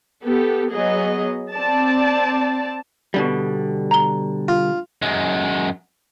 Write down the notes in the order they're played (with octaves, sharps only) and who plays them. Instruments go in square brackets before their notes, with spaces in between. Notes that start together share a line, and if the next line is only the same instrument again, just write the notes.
[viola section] B3 G4 A4
F#3 B3 G#4 D#5
C4 D5 A5
[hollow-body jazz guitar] B2 D3 G3
[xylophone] A#5 G7
[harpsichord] F4
[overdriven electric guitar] F#2 G#3